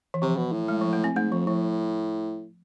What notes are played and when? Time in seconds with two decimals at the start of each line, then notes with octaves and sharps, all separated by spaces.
0.14 E3
0.22 C3 F3
0.37 B2
0.52 A2
0.68 G#3
0.81 F3
0.93 A3
1.04 C4
1.15 G#2 A3
1.32 F2 F3
1.47 A2 F3